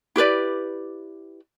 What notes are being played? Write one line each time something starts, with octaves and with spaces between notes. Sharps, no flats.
E4 G4 B4 D5